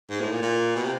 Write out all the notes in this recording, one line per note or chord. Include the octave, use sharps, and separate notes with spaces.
G#2
A2
A#2
A#2
B2
C3